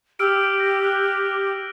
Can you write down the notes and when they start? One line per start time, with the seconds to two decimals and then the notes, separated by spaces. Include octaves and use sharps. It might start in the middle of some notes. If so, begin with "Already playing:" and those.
0.19 G4 E6 F6 D7
0.60 A#6
0.83 E6 F#6